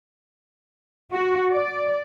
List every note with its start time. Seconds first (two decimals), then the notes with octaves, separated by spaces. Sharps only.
1.13 F#4
1.52 D5